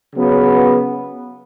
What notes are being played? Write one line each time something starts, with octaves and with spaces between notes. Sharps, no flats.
C#3 F#3 B3